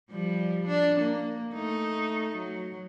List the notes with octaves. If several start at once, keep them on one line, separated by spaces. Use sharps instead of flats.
F3 G3
D4
A#3
A3 D#4
F#3